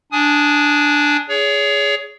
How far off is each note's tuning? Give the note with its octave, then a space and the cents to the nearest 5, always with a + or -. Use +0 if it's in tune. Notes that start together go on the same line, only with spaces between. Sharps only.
D4 +0 G#5 +20 D#6 +0
G#4 +0 C#5 +30